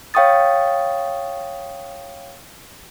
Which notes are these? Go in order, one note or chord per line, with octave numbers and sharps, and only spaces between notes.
C#5 F5 G5 C#6 D#6 A6